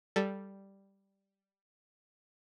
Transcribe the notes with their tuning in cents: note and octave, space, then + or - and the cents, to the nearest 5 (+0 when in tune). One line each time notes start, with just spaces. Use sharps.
G3 +0 A4 +0